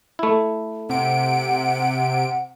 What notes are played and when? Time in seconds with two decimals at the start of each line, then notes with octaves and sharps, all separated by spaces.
0.19 A3 E4
0.89 C3 F#5 D7